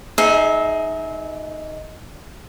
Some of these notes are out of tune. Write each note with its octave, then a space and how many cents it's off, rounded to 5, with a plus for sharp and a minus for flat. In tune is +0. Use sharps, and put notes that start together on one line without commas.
D#4 +0 G#4 +20 E5 -25